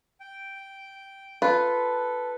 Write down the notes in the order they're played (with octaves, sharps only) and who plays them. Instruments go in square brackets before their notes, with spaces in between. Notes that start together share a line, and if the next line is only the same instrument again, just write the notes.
[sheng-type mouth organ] G5
[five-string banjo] F4 [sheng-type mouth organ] A4 [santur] B4